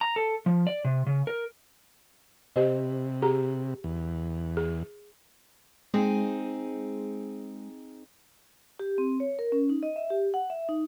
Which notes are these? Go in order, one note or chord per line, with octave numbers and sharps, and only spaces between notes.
A#5
A4
F3
D5
C3
C#3
A#4
C3 G4 C5 D#5
G4 G#4 A#5
E2
G#4
G#3 C4 D#4 G#4
G4
C4
C#5
A#4
C#4
D#4
D#5
E5
G4
F#5
E5
D#4